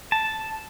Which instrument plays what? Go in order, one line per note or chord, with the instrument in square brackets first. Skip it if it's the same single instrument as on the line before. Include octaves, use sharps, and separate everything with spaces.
[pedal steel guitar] A5